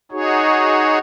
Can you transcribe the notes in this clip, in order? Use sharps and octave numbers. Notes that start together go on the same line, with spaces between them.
D#4 F#4 G#4 C#5